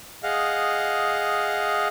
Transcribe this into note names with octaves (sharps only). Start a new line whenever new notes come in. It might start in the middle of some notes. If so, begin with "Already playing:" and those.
G#4 D#5 F5 F#5